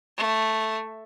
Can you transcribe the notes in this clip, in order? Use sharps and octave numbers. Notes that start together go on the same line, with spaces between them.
A3